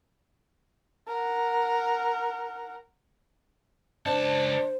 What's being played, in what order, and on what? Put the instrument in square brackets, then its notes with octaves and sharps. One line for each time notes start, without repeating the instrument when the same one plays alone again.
[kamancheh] A#4 F#5
[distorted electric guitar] C#2 A5 [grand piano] D4 [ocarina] C5